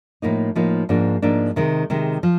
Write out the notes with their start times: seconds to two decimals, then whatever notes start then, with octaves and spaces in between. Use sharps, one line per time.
0.22 A2 F3 A#3 D#4
0.55 A2 F3 A#3 D#4
0.89 G#2 F3 A#3 D4
1.22 G#2 F3 A#3 D4
1.56 C3 D#3 G#3
1.90 C3 D#3 G#3
2.23 F3